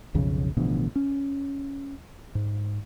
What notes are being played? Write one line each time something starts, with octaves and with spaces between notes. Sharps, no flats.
B1 F2 C#3
A1 B2 D3 F3
C#4
G#2